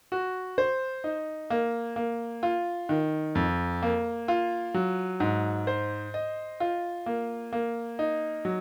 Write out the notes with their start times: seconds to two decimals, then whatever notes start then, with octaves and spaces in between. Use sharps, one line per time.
0.12 F#4
0.58 C5
1.04 D#4
1.50 A#3
1.96 A#3
2.43 F4
2.89 D#3
3.35 F2
3.83 A#3
4.28 F4
4.74 F#3
5.20 G#2
5.67 C5
6.14 D#5
6.60 F4
7.06 A#3
7.53 A#3
7.99 D#4
8.45 F#3